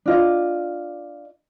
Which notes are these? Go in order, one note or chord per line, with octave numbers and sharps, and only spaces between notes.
D4 F4 D#5